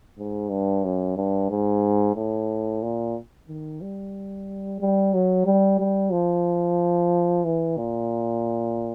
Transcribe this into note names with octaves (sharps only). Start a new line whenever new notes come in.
G#2
G2
F#2
G2
G#2
A2
A#2
D#3
G3
G3
F#3
G3
G3
F3
E3
A#2